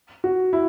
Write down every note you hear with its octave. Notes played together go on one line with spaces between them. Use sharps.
F#4
E4